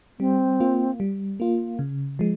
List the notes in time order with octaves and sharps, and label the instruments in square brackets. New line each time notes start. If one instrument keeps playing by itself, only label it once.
[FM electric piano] G3 [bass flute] C4
[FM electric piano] A#3 F4
G3
A#3 F4
C#3
F3 G#3